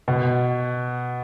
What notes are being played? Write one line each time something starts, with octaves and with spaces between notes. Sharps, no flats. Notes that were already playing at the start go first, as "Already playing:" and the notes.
B2